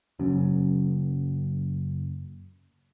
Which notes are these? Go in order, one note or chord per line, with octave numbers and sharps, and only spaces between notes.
F#1 F#2